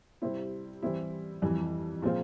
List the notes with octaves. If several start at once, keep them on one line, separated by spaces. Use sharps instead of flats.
C3 G3 C4 E4
E3 G3 C4 E4
F2 E3 G3
A#2 F3 G#3 C4 F4